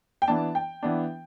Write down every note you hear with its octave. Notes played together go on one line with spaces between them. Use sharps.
G5
E3 B3 D4 A5
G5
E3 B3 D4